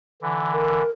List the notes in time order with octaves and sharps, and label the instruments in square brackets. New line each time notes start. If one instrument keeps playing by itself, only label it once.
[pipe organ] D3 E3
[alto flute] A#4